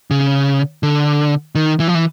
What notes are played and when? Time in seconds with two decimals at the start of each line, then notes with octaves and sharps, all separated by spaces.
0.11 C#3
0.83 D3
1.55 D#3
1.80 E3
1.88 F3
1.95 E3